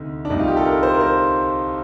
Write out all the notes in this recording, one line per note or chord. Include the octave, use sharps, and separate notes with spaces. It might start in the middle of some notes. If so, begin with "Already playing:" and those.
Already playing: D2 C3 D#4
D4
C2 C3 G3 D#4
F4
G4
A4
A#4
C5
A#4
C5